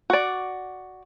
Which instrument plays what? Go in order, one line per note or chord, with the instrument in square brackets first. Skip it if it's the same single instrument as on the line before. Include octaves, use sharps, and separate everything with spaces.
[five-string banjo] F#4 D5